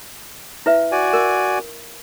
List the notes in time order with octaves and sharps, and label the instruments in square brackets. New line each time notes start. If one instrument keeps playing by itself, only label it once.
[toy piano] E4 B4 E5
[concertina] F#4 D5 G#5
[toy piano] A#4